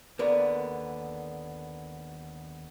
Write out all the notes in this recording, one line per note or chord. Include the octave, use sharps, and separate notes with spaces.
D#2 D3 A#3 B3 A#4 D5